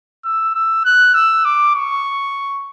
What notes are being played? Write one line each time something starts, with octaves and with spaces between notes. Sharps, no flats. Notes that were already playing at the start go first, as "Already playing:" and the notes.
E6
E6
F#6
E6
D6
C#6